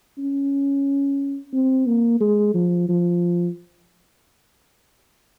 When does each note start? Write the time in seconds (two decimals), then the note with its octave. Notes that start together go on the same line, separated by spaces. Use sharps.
0.18 C#4
1.53 C4
1.86 A#3
2.20 G#3
2.54 F3
2.89 F3